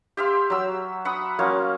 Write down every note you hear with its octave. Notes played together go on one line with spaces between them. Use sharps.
G4 E5 F5 C6
F#3 E6
E5 F#5 B5 D#6
F#3 A#3 C#4 F4